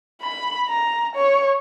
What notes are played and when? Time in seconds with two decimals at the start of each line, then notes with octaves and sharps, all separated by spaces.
0.22 B5
0.68 A#5
1.16 C#5